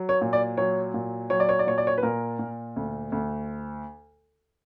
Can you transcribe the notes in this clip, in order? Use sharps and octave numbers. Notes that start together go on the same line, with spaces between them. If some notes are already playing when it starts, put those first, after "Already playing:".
Already playing: F#3
C#5
A#2
D5
F#3 C#5
A#2
F#3 C#5
D5
C#5
D5
A#2 C#5
D5
C#5
B4
A#2 A#4
A#2
D2
D2